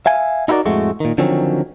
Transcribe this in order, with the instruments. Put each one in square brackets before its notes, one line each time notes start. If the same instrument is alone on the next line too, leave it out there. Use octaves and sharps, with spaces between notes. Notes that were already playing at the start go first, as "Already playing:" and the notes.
[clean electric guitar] E5 F5 G#5
D#4 E4 F#4 G4 A#4 D5
F2 A2 G#3 A3 F#4
A#2 D#3
D3 D#3 F3 F#3 C4 C#4